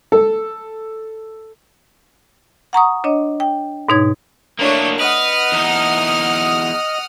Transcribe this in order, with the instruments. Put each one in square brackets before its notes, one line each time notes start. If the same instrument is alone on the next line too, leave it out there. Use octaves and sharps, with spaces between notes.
[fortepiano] A4
[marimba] F#5 A#5 C#6 D#6
D4 C#5 D#5
G5
G#2 B2 D#4 C#5 G#6
[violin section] A3 D4 C#5 [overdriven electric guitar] A#3 F#4
[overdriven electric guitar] B4 [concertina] D#5 [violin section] F#5 D#6 F6
[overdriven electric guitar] E2 D#4